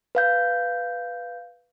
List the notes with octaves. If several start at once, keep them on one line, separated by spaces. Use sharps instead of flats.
B4 F5 G6